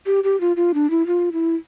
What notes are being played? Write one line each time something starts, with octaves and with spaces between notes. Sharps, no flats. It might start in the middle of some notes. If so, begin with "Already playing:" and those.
G4
G4
F4
F4
D4
E4
F4
E4